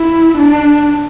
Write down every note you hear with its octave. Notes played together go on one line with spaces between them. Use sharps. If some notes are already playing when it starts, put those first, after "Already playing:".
Already playing: E4
D4